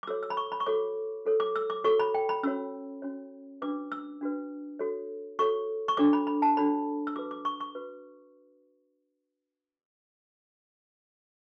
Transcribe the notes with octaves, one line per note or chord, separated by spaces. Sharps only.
D6
F#4 A4 C#5 E6
E6
B5
C#6
B5
C#6
F#4 A4 C#5 D6
F#4 A4 C#5
D6
E6
D6
F#4 A4 C#5 C#6
B5
G5
B5
C#4 F#4 C#5 E6
C#4 F#4 C#5
D4 F#4 B4 D6
E6
D4 F#4 B4
F#4 A4 C#5
F#4 A4 C#5 C#6
C#6
D4 F#4 A4 C#5 D6
B5
B5
A5
D4 F#4 A4 C#5 B5
E6
F#4 B4 D6
D6
C#6
C#6
F#4 B4